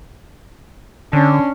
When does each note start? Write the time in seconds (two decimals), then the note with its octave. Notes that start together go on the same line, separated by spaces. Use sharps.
1.13 D3 C#4 D4